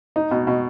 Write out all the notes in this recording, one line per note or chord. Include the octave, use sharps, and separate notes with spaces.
D#4
B2
B2